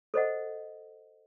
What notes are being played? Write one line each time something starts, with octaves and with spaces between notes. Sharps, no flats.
A4 C5 D#5 F#5